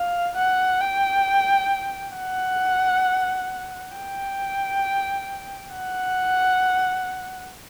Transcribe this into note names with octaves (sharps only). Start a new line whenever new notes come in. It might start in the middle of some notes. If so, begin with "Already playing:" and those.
Already playing: F5
F#5
G5
F#5
G5
F#5